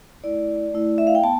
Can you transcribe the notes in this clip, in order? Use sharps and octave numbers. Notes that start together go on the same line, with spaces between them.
A3 E4 D5
A3 E4
E5
F5
G5
B3 A5